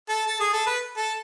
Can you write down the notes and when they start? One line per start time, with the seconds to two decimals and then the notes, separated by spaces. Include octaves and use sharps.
0.09 A4
0.27 A4
0.40 G#4
0.53 A4
0.67 B4
0.97 A4